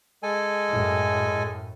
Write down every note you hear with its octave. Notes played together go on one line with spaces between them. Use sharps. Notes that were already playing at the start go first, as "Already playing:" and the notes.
G#3 A4 G#5
F#2 A2